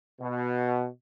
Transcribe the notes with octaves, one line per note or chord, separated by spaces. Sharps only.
B2